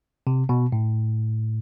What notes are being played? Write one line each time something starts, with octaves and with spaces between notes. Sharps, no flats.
C3
B2
A2